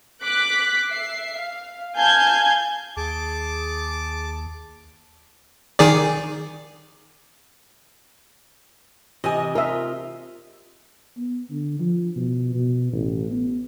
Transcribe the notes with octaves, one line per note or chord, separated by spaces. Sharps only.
D6 F#6 B6
E5 C7
F5
F5 G#5 A5 G6 G#6
D#2 G#4 A5 D6
D#3 G#4 D5
C3 E3 D#5 G#5
F4 A#4 E5
B3
D3
F3
B2
B2
A1
B3